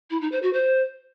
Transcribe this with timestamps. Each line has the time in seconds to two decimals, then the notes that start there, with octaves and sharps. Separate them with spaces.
0.10 E4
0.21 D#4
0.32 C5
0.43 F#4
0.53 C5